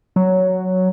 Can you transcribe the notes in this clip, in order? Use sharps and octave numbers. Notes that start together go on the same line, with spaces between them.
F#3